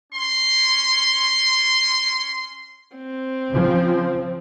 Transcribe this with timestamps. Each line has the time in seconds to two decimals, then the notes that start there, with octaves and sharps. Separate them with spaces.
0.13 C#4 C6
2.96 C4
3.51 C#3 F3